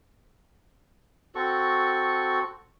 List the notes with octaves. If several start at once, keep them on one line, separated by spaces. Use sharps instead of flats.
C4 F#4 A4 C#6